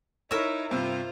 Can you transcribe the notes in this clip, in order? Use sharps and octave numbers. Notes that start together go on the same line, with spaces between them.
D#4 E4 A#4 C#5 E5
G2 C3 F4 C5